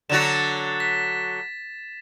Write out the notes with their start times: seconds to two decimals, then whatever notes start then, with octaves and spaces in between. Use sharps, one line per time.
0.10 D3 F#3 F#4 A6 E7
0.80 B6